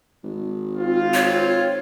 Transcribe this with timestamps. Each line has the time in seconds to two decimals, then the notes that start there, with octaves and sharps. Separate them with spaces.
0.24 G#1
0.78 C4 F4
1.13 C#5